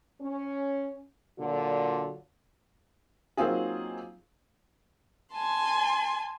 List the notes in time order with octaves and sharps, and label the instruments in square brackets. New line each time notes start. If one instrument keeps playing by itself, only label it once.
[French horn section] C#4
A#2 D3 F#3 F4
[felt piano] F#3 A#3 C4 D#4 F4 G#4
[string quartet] G#5 A5 C6